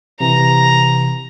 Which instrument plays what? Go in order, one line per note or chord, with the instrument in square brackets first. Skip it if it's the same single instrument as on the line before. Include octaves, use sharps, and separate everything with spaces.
[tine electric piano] C3 E3 [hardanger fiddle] A#5